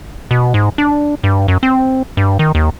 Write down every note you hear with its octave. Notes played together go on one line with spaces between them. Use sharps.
B2
G#2
D4
G2
F#2
C4
G2
D#3
D#2